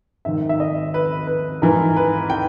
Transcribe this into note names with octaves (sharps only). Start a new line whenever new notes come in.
G#2 D#3 E5
E5
D#5
B4
B4
G#2 E3 A#4
B4
G5